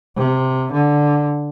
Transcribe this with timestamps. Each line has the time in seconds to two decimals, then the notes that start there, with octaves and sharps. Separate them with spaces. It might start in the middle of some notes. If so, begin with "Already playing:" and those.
0.16 C3
0.72 D3